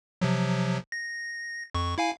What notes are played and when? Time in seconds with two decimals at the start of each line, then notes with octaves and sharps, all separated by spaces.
0.21 C3 F3 F#3
0.92 A#6
1.75 F2 C#6
1.98 E4 F5 G#5